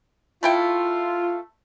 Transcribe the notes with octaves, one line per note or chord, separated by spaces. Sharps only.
A3 E4 F4 G5